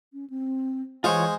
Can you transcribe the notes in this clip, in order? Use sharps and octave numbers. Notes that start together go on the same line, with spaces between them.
C#4
C4
E3 G#3 F4 C5 C#5 G#5